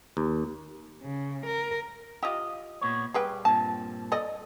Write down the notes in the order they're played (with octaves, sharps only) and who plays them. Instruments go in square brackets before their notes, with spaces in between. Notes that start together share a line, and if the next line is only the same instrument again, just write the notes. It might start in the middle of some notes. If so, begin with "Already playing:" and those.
[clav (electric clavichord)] D#2
[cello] C#3
A#4
[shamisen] F4 G4 [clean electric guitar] D#5
[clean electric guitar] A#2 B3 C#5
[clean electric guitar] G3 [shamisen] G#4 B4 G5
[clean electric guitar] G2 A#2 C4 [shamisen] A5
[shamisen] A4 D5 D#5